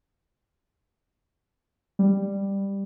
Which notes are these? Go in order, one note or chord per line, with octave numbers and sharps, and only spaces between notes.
G3